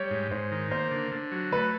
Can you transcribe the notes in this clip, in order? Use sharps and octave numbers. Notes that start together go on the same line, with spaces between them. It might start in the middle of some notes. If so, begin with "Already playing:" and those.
Already playing: G3 C#5
G#2
G#2 C5
D#3
A#3 C5
D3
D3
F#3
A3 B4